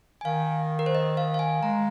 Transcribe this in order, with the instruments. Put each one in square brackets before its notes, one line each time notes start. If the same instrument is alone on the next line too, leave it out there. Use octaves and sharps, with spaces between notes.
[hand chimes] G#5
[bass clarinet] D#3 [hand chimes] F5
[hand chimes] A#4
C5
D#5
F5
F5
G#5
[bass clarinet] G#3 [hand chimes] A#5